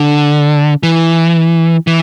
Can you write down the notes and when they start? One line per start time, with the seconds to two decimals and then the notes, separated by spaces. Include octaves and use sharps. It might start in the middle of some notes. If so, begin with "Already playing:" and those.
Already playing: D3
0.83 E3
1.87 E3